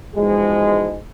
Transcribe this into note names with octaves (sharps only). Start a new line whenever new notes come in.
G#2 B2 E3 F3 G#3